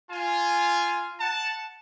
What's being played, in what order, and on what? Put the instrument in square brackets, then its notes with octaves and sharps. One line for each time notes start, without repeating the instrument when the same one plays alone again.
[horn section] F4 G#5
F#5 A5